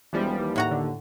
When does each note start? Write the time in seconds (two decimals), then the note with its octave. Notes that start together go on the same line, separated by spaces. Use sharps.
0.13 E1 E3 F3 G3
0.39 D#2
0.56 A2 F#4 A#5
0.71 D3